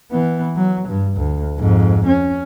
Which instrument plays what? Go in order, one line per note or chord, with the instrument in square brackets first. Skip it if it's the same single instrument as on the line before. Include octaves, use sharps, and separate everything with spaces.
[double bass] E3 B3
F#3
G2
D2
F2 G#2
C#4